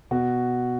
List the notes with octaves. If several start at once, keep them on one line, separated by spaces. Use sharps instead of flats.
B2 F#4